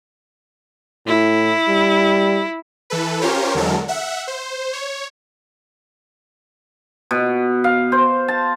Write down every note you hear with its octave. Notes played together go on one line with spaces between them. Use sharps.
A2 E4
G3
E3 A4 B4
C#4 F4 G4 A#4 C5 C#5
E2 D3 F#3 G#3 A4 A#4
E5 F#5
C5
C#5
B2
F5
C5
A5